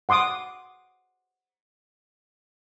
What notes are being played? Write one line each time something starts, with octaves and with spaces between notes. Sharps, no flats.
F#5 C6 D6 D#6